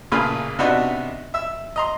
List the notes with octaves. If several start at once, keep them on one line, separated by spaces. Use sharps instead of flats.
A1 A#2 C#3 F4 B4 B5
C3 B3 D4 D#4 F#4 B4
E5 E6
D#5 A#5 C6